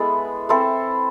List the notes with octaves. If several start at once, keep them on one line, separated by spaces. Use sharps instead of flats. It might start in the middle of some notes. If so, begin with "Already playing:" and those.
Already playing: G#3 B3 E4 A4
C4 E4 A4 C5